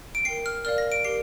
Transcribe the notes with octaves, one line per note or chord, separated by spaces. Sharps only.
D7
A#4 G5 C7
F6
A#4 D5 F5 F6
A#6
D7
G4 A#4 C7